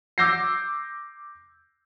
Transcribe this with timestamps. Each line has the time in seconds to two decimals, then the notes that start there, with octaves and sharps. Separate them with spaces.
0.18 D6 E6 G6 A#6 C7